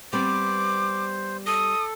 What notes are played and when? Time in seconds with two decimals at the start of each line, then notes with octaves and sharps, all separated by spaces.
0.13 G3 B3 C4 C5 D6
1.47 A4 D#6